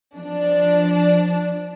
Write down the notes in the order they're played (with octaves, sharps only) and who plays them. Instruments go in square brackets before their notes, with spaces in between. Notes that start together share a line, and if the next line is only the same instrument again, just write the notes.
[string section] F3 D4